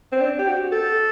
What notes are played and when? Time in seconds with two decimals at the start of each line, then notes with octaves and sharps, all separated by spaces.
0.12 C4
0.21 D4
0.39 G4
0.47 F#4
0.72 A4